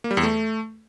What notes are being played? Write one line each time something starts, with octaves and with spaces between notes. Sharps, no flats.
A#3
G3
E2
A3